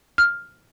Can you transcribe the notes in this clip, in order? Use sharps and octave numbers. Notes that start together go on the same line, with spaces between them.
F6